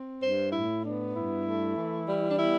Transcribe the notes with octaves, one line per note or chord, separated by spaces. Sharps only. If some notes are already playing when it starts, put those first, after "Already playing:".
Already playing: C4
G2 C5
A2 E4
B3 D4
G2 E4
A3
E3
G3
D4
B3 E4